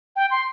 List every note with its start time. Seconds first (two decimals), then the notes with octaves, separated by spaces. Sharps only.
0.16 G5
0.31 C6